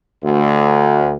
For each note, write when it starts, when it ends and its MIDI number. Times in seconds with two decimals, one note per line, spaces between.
0.24 1.15 38